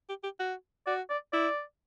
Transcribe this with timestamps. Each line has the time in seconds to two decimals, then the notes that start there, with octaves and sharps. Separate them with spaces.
0.09 G4
0.24 G4
0.40 F#4
0.87 F#4 D5
1.10 D5
1.33 E4 D5